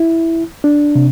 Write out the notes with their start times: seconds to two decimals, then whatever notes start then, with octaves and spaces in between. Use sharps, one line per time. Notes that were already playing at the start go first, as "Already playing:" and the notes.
Already playing: E4
0.64 D4
0.95 C3